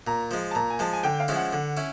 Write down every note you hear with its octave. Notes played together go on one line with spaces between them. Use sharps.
A#2 A#5
F3 G#3
A5
A#2 A#5
G#5
F3 G#3 A5
G#5
D3 G5
F5
F3 G#3 C#4 E4
F#5
D3
C#4 E4